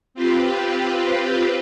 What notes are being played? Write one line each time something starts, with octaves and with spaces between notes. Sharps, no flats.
C4 F4 G4 B4